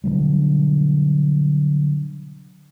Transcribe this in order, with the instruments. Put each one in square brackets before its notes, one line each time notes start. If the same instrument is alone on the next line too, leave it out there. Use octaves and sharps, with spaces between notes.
[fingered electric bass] B2 D3 F#3 G3